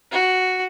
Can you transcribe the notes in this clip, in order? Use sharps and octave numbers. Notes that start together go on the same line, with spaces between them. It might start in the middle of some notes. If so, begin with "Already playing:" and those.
F#4